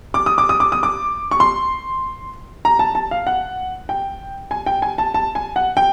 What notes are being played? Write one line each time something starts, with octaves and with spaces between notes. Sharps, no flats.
D6
D#6
D6
D#6
D6
D#6
D6
C#6
C6
A#5
A5
A5
F5
F#5
G5
G#5
G5
G#5
A5
A5
G#5
F#5
G5